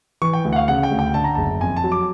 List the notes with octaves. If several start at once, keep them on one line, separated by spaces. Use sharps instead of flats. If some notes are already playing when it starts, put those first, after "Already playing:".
E3 C#6
G5
D2
F#5
F5
C#3 F#5
G5
D2
G5
D3 A5
A#5
F#1 A5
F2 G#5
A5
F#3
D6